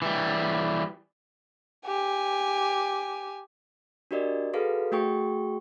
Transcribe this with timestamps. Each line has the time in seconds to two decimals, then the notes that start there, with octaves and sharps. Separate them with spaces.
0.02 E3 G3
1.86 G4 G#5
4.11 D4 F#4 G4 A#4 D5 D#5
4.53 F#4 G#4 A4 B4 F5
4.92 A3 F#4 G#4 G5 C#6